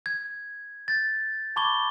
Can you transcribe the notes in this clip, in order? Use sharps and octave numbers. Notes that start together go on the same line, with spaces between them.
G#6
G6 A6
A5 B5 C#6 D6 G#6 G7